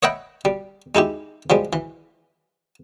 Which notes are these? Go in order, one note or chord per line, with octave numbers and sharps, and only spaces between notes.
C#5 D#5 E5 F#5 G5 B5
G3
G#3 D#4 E4 G4
F3 G3 G#3
E3